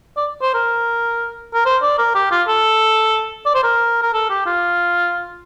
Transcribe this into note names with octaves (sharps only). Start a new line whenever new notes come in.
D5
C5
A#4
A#4
C5
D5
A#4
G4
F4
A4
D5
C5
A#4
A#4
A4
G4
F4